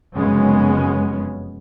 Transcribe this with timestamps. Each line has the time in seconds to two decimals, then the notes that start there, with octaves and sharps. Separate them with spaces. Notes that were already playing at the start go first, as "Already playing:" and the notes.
0.16 F1 F#2 C#3 G#3 B3 C#4